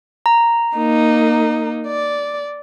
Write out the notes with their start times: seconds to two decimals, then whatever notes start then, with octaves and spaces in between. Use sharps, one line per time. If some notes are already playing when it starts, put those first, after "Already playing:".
0.26 A#5
0.76 A#3 D#4
1.87 D5